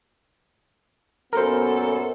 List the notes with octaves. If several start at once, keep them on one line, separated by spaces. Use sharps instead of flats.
F#2 A#2 B3 A4 A#4 C5